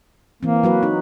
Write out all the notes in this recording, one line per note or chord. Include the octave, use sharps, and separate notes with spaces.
E3 A#3 C4
F#3 F#4 B4
D#4